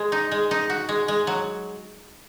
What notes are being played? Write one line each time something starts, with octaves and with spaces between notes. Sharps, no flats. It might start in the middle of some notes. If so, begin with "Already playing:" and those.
Already playing: G#3
D#4
G#3
D#4
F#4
G#3
G#3
F#3